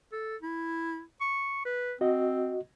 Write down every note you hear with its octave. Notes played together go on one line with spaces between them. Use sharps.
A4
E4
C#6
B4
C4 F#4 D#5